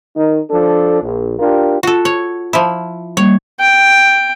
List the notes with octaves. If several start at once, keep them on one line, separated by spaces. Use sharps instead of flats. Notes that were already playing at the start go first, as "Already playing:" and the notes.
D#3 D#4
F3 D4 A4
A#1
D4 F4 G4 A#4
F4 F#4 A4
C#5
F3 E4
G3 A#3 C#5
G5